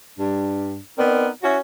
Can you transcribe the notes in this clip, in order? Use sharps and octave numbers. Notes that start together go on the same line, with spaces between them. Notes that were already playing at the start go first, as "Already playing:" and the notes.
G2 G3 D4
B3 C4 D#4 A#4 D5
C#4 E4 F#4